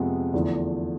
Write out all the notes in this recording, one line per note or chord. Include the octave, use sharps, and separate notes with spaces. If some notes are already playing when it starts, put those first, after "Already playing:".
Already playing: F2 C3 G#3 B3
E2 D3 F3 A3 E4